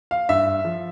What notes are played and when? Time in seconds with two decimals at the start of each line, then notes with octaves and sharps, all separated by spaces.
0.11 F5
0.29 G2 E5
0.65 F3